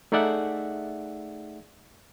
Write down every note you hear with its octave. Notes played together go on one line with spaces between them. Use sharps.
A3 D#4 G#4 D5 E5 F#5